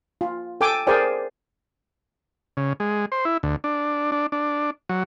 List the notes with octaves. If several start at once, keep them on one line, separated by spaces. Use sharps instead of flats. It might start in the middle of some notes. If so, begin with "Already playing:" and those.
F4
A4 G5 G#5 D6
G#4 A#4 C5 D5 G5 G#5
C#3
G#3
C5
E4
D2
D4
D4
D4
F#3